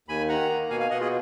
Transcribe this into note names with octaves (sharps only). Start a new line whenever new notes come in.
D#2 G#5 B5
D#3 F#5 A#5
A#3
B2 F5 G#5
F5 G#5
B2 D#5 F#5
F4 G#4